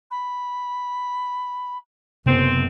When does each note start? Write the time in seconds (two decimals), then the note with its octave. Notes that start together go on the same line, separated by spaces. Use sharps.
0.10 B5
2.26 F#1 F#2 C3 B3 C4